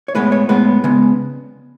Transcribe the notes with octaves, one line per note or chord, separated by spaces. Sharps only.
C#5
A2 G#3 B3 B4
C#5
A2 G#3 B3 B4
C#3 G#3 B3